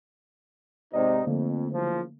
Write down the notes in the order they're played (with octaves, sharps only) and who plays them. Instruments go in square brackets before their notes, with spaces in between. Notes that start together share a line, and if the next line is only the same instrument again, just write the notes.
[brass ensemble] G#2 C3 D#4 [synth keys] C5 D5 D#5
[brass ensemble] F2 [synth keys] D3 A3 A#3
[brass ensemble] F#1 F3